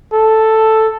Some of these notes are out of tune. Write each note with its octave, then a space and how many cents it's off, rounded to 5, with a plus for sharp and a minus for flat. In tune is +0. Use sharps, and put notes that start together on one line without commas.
A4 +0